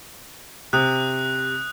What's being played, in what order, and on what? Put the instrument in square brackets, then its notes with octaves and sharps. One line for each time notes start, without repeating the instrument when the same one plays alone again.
[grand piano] C3 [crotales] D#6 F#6